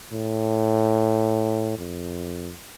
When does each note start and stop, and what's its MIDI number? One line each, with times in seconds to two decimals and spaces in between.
0.13 1.77 45
1.78 2.53 41